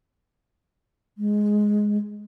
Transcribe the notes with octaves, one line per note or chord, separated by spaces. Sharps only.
G#3